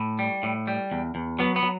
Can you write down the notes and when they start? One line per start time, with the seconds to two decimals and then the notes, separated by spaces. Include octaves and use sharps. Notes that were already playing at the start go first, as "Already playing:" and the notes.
Already playing: A2
0.19 G3
0.43 A2
0.67 G3
0.92 E2
1.15 E2
1.39 F#3 B3
1.56 B3
1.63 F#3